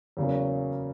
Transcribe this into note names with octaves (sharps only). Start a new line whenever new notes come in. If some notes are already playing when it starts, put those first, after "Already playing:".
E2 C#3 F#3 A#3 C#4